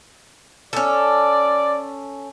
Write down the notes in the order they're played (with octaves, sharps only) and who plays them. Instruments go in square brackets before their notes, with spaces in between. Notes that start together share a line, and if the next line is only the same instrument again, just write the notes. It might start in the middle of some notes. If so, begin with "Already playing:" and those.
[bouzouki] C#4 A4 [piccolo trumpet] D5